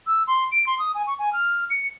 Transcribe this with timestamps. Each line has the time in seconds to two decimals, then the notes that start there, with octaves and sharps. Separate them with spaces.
0.07 E6
0.27 C6
0.52 D7
0.67 C6
0.79 D#6
0.95 G#5
1.07 C#6
1.19 G#5
1.33 F6
1.70 C#7